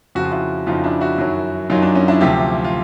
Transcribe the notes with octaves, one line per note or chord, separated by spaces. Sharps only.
F2 C#3 F3 F#4
F4
E4 F#4
F2 C#3 F3 D#4 F4
D4 E4
E4 F#4
F#2 D#3 F#3
F#2 D#3 F#3 D#4 F4
D4
C#4 D#4
D4 E4
D2 C3 F3 F4 G4
F4